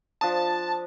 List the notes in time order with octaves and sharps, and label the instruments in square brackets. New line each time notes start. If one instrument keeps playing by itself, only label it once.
[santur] F3 D4 D#6 [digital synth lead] A5